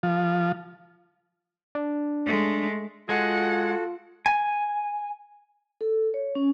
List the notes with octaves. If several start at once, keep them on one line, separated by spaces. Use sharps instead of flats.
F3
D4
G#3 A3
G#3 F4 F#4 A4 F#5
G#5
A4
C#5
C#4